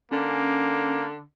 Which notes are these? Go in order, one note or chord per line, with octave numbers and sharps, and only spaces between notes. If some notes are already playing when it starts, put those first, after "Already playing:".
D3 A#3 C#4